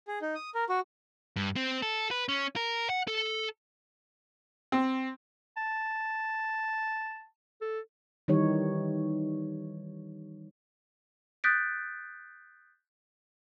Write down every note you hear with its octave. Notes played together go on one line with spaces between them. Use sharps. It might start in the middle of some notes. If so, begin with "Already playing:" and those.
G#4
D#4
D#6
A#4
F#4
G2
C4
A4
B4
C#4
A#4
F#5
A4
C4
A5
A4
D#3 E3 G3 D#4 C#5
D#6 F#6 G6 A6 B6 D7